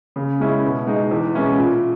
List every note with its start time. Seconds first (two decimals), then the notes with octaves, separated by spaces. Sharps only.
0.16 C#3
0.40 G#3 C#4 E4
0.64 B2
0.87 G#3 D#4
1.11 E2
1.34 B2 G#3 C#4 E4
1.58 A#2